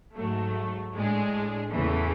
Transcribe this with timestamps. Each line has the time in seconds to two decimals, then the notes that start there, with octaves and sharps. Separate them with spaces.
0.15 G#2 F#3 A3
0.94 A2 G#3 D4 G#4
1.73 E2 C#3 E3 A3